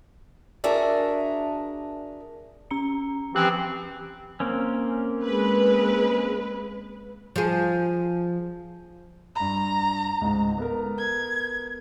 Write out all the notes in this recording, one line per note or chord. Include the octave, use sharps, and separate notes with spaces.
D4 F#4 G#4 A#4 E5
C#4 A#5 C#7
E3 F3 C4 G4 F#6
A#3 C4 C#4
G#3 B4
F3 G#4
G2 A#5 B5
C#2 G#2
B3 A4 A#4
G#6